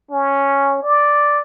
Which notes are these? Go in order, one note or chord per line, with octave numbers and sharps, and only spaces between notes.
C#4
D5